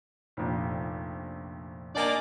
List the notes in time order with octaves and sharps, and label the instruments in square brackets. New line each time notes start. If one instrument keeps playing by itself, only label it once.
[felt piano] F1 A#1
[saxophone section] A#3 D#4 D5 [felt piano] D4 G#5